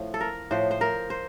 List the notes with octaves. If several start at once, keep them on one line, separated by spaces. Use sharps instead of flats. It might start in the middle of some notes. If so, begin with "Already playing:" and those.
Already playing: A2 F3
A4
A#4
A2 F3 C5
C5
A#4
C5